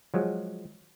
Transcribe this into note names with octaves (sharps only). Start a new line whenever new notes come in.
F3 F#3 G#3